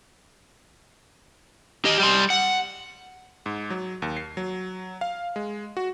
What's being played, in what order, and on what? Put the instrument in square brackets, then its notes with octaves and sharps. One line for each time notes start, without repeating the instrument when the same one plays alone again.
[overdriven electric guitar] G4 D#5
G3 C6
F#5
[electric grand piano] G#2
F#3
D#2
C7
F#3
F5
G#3
F#4